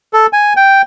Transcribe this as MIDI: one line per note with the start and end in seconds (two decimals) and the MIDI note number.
0.13 0.26 69
0.33 0.53 80
0.57 0.82 79